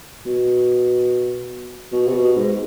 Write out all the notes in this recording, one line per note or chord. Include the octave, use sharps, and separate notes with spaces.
B2
B2
C3
B2
G#2